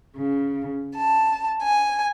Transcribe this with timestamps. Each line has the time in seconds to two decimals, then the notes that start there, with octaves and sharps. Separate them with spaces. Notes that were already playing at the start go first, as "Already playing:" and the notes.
0.17 C#3
0.95 A5
1.63 G#5